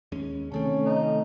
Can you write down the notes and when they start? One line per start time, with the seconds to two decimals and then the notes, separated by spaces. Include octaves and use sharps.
0.12 D#2 G#3 C#4
0.52 C3 D#3 A3 C4 C#4 A4
0.86 D#4